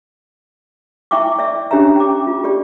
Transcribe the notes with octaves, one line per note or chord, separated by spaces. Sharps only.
E4 E5 G5 C#6 D6
D5 E5
C#4 D4 G4 C#5 E5 A#5
G5 D6
F4
G4 D5